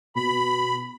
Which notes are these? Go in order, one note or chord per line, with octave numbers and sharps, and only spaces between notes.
B2 B5